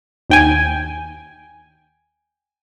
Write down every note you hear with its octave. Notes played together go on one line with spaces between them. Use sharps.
D#2 G5 G#5